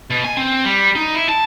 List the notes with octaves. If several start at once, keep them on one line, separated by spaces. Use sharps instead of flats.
B2
G#5
C4
G3
D#4
E4
A5